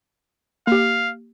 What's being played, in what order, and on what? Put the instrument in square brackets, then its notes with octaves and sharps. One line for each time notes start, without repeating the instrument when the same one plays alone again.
[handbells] A#3 G4 [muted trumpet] F5